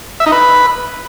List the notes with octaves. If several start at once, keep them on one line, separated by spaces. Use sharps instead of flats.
E5
D#4
B4